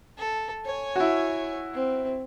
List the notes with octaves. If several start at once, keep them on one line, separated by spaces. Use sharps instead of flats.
A4
C#5 G#5
E4 F#4
C4